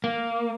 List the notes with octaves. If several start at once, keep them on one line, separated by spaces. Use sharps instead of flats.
A#3